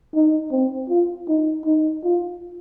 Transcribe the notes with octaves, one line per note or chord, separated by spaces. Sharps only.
D#4
C4
F4
D#4
D#4
F4